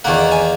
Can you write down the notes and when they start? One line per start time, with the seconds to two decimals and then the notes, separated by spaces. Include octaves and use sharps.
0.04 E2 D#3 A#3 F#5
0.32 G#5